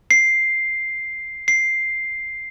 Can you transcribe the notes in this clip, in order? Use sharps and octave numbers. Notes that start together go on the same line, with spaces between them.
C7
C7